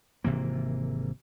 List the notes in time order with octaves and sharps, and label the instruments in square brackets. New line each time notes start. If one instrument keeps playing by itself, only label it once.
[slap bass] G#1 C3 E3 A#3